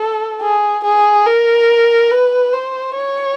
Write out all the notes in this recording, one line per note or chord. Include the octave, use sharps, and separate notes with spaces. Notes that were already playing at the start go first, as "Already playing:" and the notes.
Already playing: A4
G#4
G#4
A#4
B4
C5
C#5